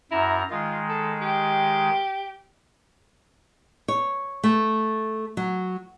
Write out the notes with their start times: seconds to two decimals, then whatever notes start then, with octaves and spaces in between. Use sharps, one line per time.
0.11 F#2 E4 A#5
0.50 D#3 G#3 F4
0.89 A4
1.22 G4
3.88 C#5
4.44 A3
5.37 F#3